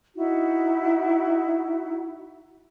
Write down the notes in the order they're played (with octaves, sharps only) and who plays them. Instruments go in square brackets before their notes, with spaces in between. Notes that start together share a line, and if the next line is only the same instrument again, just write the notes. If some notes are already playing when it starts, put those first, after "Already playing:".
[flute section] D#4 E4 F#4